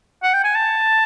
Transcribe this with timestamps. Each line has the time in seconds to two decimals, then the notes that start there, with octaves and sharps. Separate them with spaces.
0.24 F#5
0.34 G5
0.44 G#5
0.55 A5